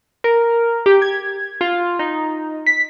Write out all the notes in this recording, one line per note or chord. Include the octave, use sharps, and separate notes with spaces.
A#4
G4
G#6
F4
D#4
B6